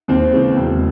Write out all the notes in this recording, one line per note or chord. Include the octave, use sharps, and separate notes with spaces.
D#2 C4
C#3 E3 G#3
E1